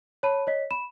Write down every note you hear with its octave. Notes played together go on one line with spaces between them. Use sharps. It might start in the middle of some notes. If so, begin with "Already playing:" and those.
C#5 A5 B5 D#7
C#5 D#5 B6
B5 E7